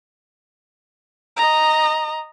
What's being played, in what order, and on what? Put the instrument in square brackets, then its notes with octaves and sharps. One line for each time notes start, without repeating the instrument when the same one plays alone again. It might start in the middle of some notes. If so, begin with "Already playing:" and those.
[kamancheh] D#5 A#5